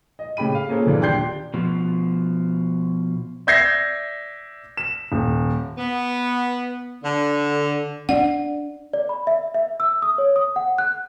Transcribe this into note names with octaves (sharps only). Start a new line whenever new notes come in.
D#5
A2 C#3 G4 B5 D#7
F5
A#3 C#4 F4 G#4 A4 C5
G1 E3 D4 F4
D#1 D4 G4 C6 G6 C7
B2 F3
D5 E5 G6 G#6 A#6 C7
E7
D#1
B3
D3
C#4 D4 D5 F#5
D5
B5
E5
E5
E6
D#6
C#5
D#6
F#5
F#6